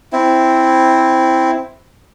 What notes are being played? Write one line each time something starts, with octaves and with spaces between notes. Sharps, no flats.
C4 E4